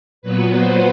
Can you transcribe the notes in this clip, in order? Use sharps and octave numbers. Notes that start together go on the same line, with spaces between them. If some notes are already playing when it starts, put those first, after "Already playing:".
A#2 F#3 B3 B4
C5